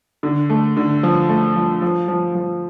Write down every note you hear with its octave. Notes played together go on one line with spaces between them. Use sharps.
D3
A3
D3
F3
A3
F3
F3
F3
F3